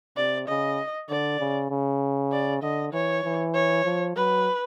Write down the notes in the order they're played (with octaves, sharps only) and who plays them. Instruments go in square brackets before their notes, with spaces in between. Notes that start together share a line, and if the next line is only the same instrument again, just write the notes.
[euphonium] C3 [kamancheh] D5
[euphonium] C#3 [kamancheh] D#5
[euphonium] D3 [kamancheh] D5
[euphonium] C#3
C#3
[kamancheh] D5
[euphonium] D3 [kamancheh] D#5
[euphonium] E3 [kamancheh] C#5
[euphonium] E3
[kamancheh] C#5
[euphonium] F3
[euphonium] F#3 [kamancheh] B4